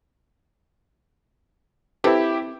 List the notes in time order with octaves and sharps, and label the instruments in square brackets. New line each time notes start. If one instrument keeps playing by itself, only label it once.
[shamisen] E3 C4 A4 [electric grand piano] E4 G4